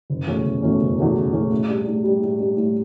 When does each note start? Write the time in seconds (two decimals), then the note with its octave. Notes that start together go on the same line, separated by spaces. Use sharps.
0.10 F#1
0.27 E2 B2 A3 C#4
0.45 F#1
0.63 E2 B2 A3 C#4
0.80 F#1
0.98 E2 B2 A3 C#4
1.16 F#1
1.33 E2 B2 A3 C#4
1.51 A2
1.68 G3 D4
1.87 A2
2.04 G3 D4
2.22 A2
2.39 G3 D4
2.57 A2